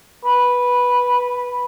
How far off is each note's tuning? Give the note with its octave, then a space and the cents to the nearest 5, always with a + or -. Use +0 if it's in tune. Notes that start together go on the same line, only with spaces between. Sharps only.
B4 -5